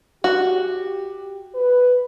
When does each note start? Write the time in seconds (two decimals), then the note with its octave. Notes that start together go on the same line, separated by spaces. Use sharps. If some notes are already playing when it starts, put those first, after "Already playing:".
0.24 F#4 G4
1.55 B4